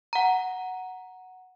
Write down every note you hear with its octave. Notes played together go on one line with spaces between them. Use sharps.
F#5 A#5